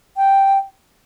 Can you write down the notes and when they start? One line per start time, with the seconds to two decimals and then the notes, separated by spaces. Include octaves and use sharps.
0.17 G5